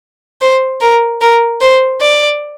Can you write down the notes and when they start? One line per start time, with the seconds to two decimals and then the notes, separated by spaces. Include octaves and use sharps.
0.41 C5
0.81 A#4
1.21 A#4
1.61 C5
2.01 D5